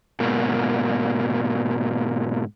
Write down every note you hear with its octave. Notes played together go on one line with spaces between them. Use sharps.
G#2 B2 A#3